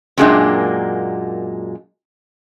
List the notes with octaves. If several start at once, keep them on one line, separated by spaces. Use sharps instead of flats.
F#2 A#2 G#3 A#3 D4 G5